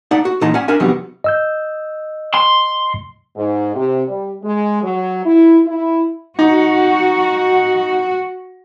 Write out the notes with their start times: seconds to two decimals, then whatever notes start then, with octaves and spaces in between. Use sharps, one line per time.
0.11 D#4 D5 E5 F#5 A5
0.25 F#4
0.41 A#2 E3 D#4 D#5 A5 A#5
0.54 C#4 D5 E5 F#5 G#5
0.68 C#4 D4 A#4 E5 G#5
0.80 F2 C3 D#3 F#3 G3 B3
1.24 D#5 E6 G6
2.34 C6
3.36 G#2
3.75 C3
4.07 G3
4.43 G#3
4.83 F#3
5.25 E4
5.66 E4
6.39 D#4 F#4